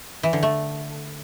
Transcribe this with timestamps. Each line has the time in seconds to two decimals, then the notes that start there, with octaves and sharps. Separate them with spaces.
0.23 E3
0.33 D3
0.43 A3